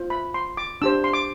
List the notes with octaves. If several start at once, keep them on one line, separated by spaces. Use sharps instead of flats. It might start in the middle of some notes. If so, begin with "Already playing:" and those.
Already playing: F4 C5
B5
C6
D6
D4 G4 C5 E6
C6
D6